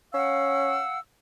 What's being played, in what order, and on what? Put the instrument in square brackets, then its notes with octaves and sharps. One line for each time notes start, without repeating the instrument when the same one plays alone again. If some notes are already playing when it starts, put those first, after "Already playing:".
[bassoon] C#4 [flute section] F5 F#5 E6